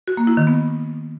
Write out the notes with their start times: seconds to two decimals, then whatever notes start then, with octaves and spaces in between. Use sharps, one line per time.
0.07 F#4
0.17 A#3
0.27 E4
0.37 D#3
0.47 B3